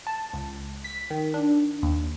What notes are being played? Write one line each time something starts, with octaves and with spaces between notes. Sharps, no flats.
A5
C#2
B6
D#3
D4
D#2